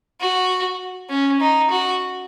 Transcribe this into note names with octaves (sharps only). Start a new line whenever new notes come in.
F#4
C#4
D#4
F#4